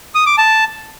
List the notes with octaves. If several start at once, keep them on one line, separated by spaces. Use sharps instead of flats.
D#6
D6
A5